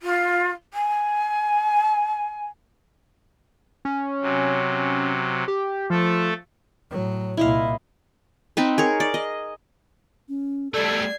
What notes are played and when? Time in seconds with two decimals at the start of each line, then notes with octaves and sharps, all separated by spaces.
0.02 F4
0.74 G#5
3.85 C#4
4.21 C3 F#3
5.48 G4
5.90 F3 A3 A4
6.90 A2 F#3
7.37 C2 A#2 E4 D#5 F5
8.57 C4 D#4 B4
8.78 G#4 A#4 C#5
9.00 D5
9.14 D#5
10.29 C#4
10.74 G3 A3 A4 D5 G#6 C7